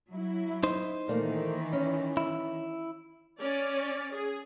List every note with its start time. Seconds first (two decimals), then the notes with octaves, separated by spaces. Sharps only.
0.10 F#3 E4
0.63 D#4 C5
1.08 A#2 D#3 E3 A3 A#3
1.73 C#4
2.17 E4
3.40 C#4 D5
4.13 G#4